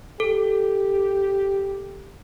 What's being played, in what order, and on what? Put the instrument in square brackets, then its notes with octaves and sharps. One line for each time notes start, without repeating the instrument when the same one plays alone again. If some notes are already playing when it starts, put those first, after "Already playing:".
[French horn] G4 [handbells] A4